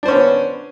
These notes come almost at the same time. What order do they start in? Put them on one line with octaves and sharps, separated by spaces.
D4 C5 C#4 B3